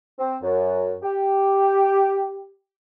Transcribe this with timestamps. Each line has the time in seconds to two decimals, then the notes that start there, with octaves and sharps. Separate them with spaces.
0.19 C4
0.42 F#2
1.03 G4